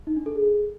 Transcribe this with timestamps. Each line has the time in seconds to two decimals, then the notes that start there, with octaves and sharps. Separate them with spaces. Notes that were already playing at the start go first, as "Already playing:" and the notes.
0.07 D#4
0.16 D4
0.26 A4
0.36 G#4